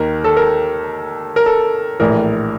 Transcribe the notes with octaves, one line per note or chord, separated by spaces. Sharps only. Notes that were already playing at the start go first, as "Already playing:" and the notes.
Already playing: D#2 D#3 A#4
A4
A#4
A#4
A4
A#1 A2 E3 A#4